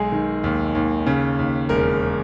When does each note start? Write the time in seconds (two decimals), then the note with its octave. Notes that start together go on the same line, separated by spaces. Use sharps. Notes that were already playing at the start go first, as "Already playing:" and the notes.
Already playing: B1 G#3 G#4
0.12 D#3
0.44 D#2
0.75 D#2
1.06 C#3
1.39 D#2
1.69 E1 A#4